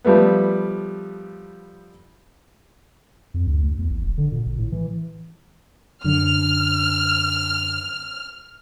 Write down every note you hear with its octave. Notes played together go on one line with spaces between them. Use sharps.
F3 G3 A3 B3
F2
D2
D2
E2
A1
E1
D3
A#2
A1
A2
E3
F#2 D3 F6